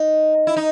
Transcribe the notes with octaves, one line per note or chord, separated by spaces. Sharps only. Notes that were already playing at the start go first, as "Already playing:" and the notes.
Already playing: D#4
E4
D#4